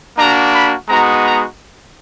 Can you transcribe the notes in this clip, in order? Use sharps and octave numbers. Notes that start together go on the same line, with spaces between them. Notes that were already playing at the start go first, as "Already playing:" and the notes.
A#3 D4 F#4 A#5
B5
G#3 B3 D#4 F#4 A#5
A#5